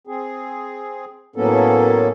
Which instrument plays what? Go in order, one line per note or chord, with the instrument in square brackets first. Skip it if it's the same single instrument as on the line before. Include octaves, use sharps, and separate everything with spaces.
[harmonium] C4 G#4
A2 F#3 A#3 B3 C#4 A4